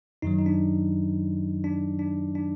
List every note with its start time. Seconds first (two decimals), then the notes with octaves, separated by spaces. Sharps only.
0.22 F#2 D#3 F#3 D#4
0.39 D#4
0.46 D4
1.64 D4
1.99 D4
2.35 D4